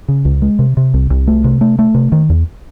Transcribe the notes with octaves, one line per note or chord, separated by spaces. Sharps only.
C#3
C#2
G#3
C3
C3
C2
C2
A3
C3
A3
A3
C3
D#3
E2